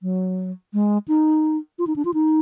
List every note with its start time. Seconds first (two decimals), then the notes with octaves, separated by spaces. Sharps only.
0.02 F#3
0.73 G#3
1.08 D#4
1.79 F4
1.87 D#4
1.96 D4
2.05 F4
2.14 D#4